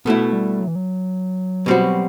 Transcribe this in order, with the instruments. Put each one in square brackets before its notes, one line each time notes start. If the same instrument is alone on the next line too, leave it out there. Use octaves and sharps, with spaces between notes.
[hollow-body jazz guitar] B2 A3 E4 [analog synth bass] B3
[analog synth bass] G3
F#3
E3
F#3
[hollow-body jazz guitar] B2 G3 C4 F#4